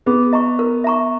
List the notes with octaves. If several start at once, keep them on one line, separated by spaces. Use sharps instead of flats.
B3 G#4
D#5 A#5 C#6
A#4
E5 A#5 C#6